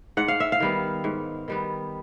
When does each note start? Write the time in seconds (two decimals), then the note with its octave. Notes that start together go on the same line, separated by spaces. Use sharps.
0.17 G#2 F#5
0.28 F5
0.40 E5
0.52 F5
0.60 D#3 G3 B3
1.04 G#2
1.48 D#3 G3 B3